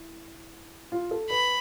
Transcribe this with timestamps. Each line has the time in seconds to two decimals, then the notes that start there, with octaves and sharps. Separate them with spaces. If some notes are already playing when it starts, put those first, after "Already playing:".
Already playing: E4
0.92 F4
1.11 A4
1.30 B4 B5